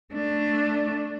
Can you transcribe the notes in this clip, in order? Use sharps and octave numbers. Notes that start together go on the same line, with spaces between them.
A3 D4